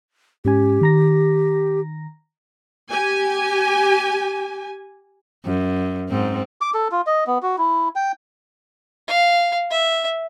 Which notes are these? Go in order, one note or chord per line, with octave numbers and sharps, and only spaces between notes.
G#2 C#4 G4 G#5
D#3 A#5 A#6
G4 G#5
F#2
G#2 C4
D6
A4
F4
D#5
B3
F#4
E4
G5
F5
E5